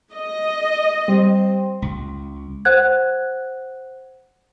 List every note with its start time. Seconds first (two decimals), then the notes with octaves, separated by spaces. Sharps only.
0.14 D#5
1.08 G3 C4
1.82 C#2
2.65 C5 F#5 F#6 G#6